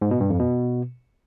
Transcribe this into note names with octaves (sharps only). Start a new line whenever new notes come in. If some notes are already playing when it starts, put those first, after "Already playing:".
G#2
B2
G2
F2
B2